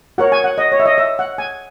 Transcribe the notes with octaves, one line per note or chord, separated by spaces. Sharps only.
F#4 A#4 C#5 F#5
G#5
F#5
D#5
C#5
E5
D#5
E5
F#5
G#5